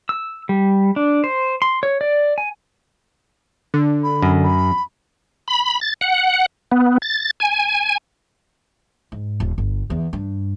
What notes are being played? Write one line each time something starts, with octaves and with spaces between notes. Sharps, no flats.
E6
G3
D4
C5
C6
C#5
D5
G#5
D3
B5
F#2
B5
B5
A6
F#5
B3
A6
G#5
G#2
D#1
G1
E2
G2